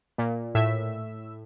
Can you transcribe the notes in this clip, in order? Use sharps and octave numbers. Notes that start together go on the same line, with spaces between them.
A#2
A2 E5